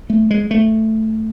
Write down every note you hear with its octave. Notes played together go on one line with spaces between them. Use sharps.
A3
G#3
A3